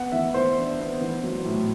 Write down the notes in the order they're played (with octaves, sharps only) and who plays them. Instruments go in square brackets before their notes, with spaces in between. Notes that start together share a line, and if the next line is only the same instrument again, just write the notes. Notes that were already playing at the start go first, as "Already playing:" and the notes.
Already playing: [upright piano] B3 [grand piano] F#5
[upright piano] E3 [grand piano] E5
[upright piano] E3 [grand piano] C5
[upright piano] D4
B3
E3
F#3
A2